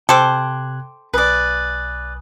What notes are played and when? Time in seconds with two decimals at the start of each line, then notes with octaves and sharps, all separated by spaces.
0.09 C3 A4 C5 G5 D6 F#6 G#6
1.14 B1 B4 D5 G#5 D#6